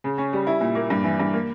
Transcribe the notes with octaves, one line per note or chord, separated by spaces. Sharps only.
C#3
C#4
G3
E4
A#2
A#3
G2
E3
G2
A#3